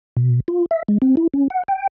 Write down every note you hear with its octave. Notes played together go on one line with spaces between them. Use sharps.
B2
F4
E5
G#3
C4
E4
C#4
F#5
G5